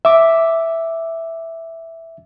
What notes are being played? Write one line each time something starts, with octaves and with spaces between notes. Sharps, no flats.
E5 D6